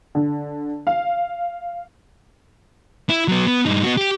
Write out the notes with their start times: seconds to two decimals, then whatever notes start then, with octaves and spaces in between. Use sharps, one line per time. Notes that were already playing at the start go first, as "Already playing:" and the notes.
0.15 D3
0.87 F5
3.09 E4
3.28 F#3 B3
3.47 B3
3.66 G2 D#4
3.84 B3 F#4
3.97 G4